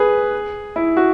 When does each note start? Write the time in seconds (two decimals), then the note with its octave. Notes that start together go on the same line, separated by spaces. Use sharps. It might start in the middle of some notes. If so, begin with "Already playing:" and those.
Already playing: G#4 B4
0.76 E4
0.97 F#4